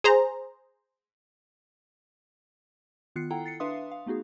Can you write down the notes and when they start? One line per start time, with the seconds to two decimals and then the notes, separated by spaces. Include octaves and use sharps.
0.04 G#4 C5 A#5
3.16 D#3 B3 F4 F#6 C7 C#7
3.30 E4 A4 F#5 G5 A#5
3.45 A6 C7 C#7
3.60 D4 B4 E5 F5 C6 D#6
3.92 F5
4.06 A3 B3 D#4 F#4 G#4